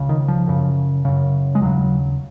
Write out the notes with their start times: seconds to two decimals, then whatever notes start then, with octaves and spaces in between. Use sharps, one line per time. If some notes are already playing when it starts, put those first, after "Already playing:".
Already playing: C#2 C#3
0.09 D#3
0.28 F3
0.47 F#2 C#3
1.05 F#2 C#3
1.55 G#3
1.61 D#2 C#3 F#3